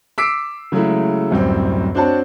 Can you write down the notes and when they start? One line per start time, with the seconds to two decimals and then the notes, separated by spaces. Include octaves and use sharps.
0.18 D6 E6 B6 C7 D7
0.72 C#3 F#3 G#3 A3 E4
1.31 D1 F#2 G3 C4
1.95 C4 D4 F#4 C5 C#5 A5